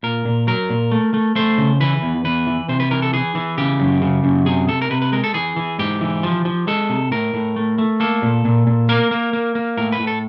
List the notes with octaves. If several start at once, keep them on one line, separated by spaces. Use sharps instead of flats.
A#2 A#4
A#2
F#3 A#4
A#2
A3
A3
A3 C5
C#3
E3 B4
E2
E2 B4
E3
C3 C5
B4
E3 A#4
A4
E3 G#4
E3
C#3 G4
F#2
C#3
F#2
C3 G#4
C3 A4
A#4
C3 B4
B4
G#3 A#4
A4
E3 G#4
E3
G#2 G4
E3
F3
F3
G#3 A4
C3
A2 A#4
A2
A3
A3
A#3 A4
A#2
A#2
A#2
A#3 A#4
A#3
A#3
A#3
A2 A#4
B4
A2
A4